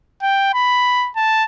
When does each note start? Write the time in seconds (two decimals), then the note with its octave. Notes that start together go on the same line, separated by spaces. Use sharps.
0.22 G5
0.54 B5
1.16 A5